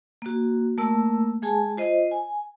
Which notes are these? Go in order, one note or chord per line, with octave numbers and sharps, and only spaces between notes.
A#3 F#4
A3 A#3 A#4 A5 E6
G#3 G#4 G#5 A5
F4 C5 D#5
G#5